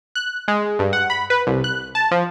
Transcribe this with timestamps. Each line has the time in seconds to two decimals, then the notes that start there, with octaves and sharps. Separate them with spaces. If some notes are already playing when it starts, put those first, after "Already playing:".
0.16 F#6
0.48 G#3
0.79 G2
0.93 F#5
1.10 B5
1.30 B4
1.47 C2
1.64 F#6
1.95 A5
2.11 F3